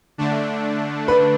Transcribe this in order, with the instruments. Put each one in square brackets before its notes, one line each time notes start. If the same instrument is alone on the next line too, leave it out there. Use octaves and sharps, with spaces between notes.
[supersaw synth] D3 A3 D4
[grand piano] B4